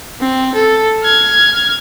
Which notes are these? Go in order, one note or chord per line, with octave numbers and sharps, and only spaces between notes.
C4
A4
F6 G#6